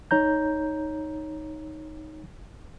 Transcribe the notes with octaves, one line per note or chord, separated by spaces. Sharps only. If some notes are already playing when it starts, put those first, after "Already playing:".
D#4 C#5 A#5 G6